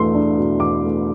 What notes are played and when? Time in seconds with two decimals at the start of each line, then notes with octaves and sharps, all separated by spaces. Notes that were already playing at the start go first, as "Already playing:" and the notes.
Already playing: E2 B2 A3 D4 C6
0.14 D4
0.38 B2
0.60 E2 D6
0.84 A3